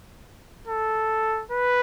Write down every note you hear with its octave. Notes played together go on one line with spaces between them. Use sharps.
A4
B4